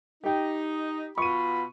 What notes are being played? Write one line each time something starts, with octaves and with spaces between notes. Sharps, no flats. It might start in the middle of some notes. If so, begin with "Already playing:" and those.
D#4 G4 G5
B2 B3 F4 B5 C#6 D#7